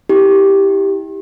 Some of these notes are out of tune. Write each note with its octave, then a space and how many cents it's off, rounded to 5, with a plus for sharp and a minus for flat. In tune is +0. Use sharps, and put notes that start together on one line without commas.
E4 -25 G4 +0